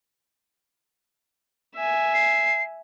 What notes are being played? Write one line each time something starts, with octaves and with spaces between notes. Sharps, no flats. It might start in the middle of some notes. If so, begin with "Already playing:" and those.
E5 G#5
C7